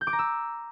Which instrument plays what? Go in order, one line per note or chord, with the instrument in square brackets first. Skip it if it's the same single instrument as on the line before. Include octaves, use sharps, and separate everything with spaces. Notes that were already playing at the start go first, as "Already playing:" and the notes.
[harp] G6
D6
A#5
E6